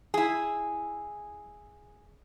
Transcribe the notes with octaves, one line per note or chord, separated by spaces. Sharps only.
E4 G#4